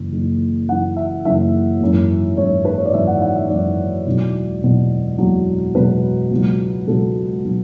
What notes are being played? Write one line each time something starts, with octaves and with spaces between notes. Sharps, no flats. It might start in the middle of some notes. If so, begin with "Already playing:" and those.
Already playing: F#1 F#2 E3
F#1 F#2 E3
F#1 F#2 E3 F#5
E5
F#1 F#2 E3 E5
G#1 F#2 E3
G#1 F#2 E3 C#5
B4
C#5
D5
G#1 F#2 E3 E5
F#5
F#5
E5
G#1 F#2 E3 D5
E1 E2 B2 F#3
E1 E2 B2 F#3
E1 E2 B2 F#3
E1 E2 B2 F#3 B4
C#2 B2 F#3
C#2 B2 F#3 A4
B2 F#3